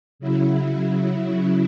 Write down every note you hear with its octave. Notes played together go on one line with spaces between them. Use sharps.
C#3 F#3 E4